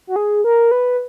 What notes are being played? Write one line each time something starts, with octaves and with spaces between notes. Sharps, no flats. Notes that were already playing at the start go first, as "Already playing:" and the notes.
F#4
G#4
A#4
B4